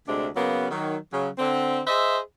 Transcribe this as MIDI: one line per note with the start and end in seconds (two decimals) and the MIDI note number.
0.07 0.28 38
0.07 0.28 48
0.07 0.28 56
0.07 0.28 62
0.36 0.68 49
0.36 0.68 54
0.36 0.68 58
0.36 0.68 59
0.71 0.96 51
0.71 0.96 54
1.12 1.29 49
1.12 1.29 54
1.38 1.81 50
1.38 1.81 60
1.87 2.18 68
1.87 2.18 72
1.87 2.18 75
1.87 2.18 76